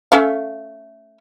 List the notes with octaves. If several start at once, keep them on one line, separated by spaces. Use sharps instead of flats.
A3 C#4 F5